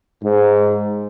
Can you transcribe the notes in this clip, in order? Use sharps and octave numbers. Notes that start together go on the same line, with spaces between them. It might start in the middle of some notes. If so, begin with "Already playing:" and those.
G#2